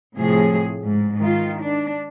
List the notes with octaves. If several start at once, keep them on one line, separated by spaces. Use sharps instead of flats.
A2 C3 F3 G#4
G#2
D#3 F4
D4